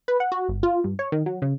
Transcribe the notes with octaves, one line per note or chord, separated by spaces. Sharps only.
B4
F#5
F#4
G1
F4
G2
C#5
D#3
F#3
C#3